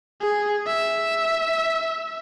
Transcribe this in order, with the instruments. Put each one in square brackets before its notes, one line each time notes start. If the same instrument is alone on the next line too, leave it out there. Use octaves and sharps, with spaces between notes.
[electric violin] G#4
E5